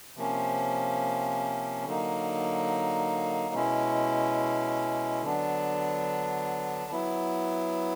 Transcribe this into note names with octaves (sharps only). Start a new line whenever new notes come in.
C3 F3 A#3 C#4
D3 F#3 A#3 D#4
B2 G#3 C#4 E4
D3 F#3 B3 D4
F#3 B3 E4